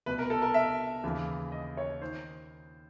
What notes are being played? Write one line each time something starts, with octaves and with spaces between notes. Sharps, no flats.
C2 B2 B4
A#4
A4
A#4
E5
D#2 C#3 E3
D#5
C#5
D#3 C5